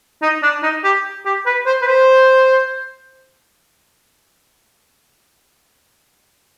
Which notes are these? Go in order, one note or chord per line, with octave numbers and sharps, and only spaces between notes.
D#4
D4
D#4
G4
G4
B4
C5
B4
C5